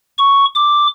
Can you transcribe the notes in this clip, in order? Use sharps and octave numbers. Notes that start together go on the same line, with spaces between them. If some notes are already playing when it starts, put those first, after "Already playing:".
C#6
D6